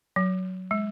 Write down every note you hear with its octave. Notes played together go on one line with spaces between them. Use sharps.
F#3
G#3